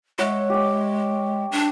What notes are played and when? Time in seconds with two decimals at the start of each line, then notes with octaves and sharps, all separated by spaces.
0.19 G#3 C#5 E5 F#5
0.50 G4 G5
1.52 D4